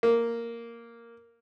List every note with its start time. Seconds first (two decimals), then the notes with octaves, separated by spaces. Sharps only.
0.03 A#3